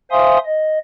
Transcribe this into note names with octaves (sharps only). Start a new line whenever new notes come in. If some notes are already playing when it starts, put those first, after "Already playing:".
C5 E5 F5 G#5 C6 D#6
D#5